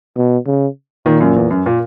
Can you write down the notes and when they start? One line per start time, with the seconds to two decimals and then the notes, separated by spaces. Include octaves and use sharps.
0.17 B2
0.46 C#3
1.06 A#2 D#3
1.20 F#2
1.36 E2
1.50 F#2
1.66 A#2